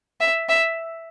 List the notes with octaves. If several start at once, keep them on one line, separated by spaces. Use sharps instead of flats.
E5
E5